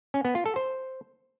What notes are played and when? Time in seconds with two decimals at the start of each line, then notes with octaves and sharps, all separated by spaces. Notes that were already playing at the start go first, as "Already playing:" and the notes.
0.14 C#4
0.25 B3
0.35 F4
0.46 A4
0.56 C5